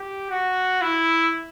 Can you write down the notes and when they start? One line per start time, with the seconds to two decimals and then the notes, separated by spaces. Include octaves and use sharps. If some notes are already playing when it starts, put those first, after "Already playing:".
Already playing: G4
0.30 F#4
0.82 E4